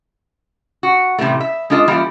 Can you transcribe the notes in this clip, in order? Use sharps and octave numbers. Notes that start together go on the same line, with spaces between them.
F#4
A2 C3 E3 G3 A3
E5
G#3 D4 F4 A4 D#5
E3 G3 A#3 C#4 E4 F4